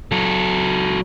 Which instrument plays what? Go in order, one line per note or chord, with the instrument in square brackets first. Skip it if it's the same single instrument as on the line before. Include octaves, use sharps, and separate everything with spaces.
[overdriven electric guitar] F#3 A4